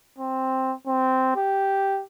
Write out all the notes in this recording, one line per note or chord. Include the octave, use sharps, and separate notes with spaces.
C4
C4
G4